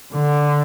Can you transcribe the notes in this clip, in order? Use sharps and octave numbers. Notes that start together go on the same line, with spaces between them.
D3